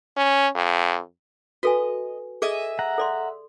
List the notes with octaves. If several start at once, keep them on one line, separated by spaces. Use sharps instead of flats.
C#4
F2
F#4 A4 B4 D#5 G#5
G#4 A4 D#5 E5 G#5
F#5 A#5
A4 D5 C6